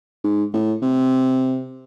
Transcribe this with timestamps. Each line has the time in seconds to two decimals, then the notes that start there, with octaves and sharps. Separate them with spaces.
0.24 G#2
0.53 A2
0.82 C3